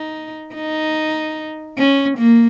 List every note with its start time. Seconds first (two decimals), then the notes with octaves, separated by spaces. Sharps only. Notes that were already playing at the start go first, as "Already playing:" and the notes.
Already playing: D#4
0.55 D#4
1.78 C#4
2.18 A#3